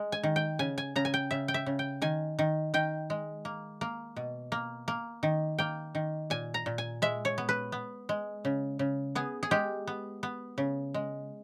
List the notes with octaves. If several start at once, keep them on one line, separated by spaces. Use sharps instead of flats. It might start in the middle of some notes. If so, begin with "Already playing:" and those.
Already playing: G#3
G#5
D#3
G5
C#3 G#5
G#5
C#3 A#5
G#5
G5
C#3 E5
G5
E5
C#3
G5
D#3 G#5
D#3
D#3 G5
G#3
A#3
A#3
B2
A#3
A#3
D#3
A#3 G5
D#3
A#2 G#5
A#5
A#2
G#5
G#3 E5
C#5
B3
B4
B3
G#3
C#3
C#3
B3 G#4
G#4
G#3 G4
B3
B3
C#3
G#3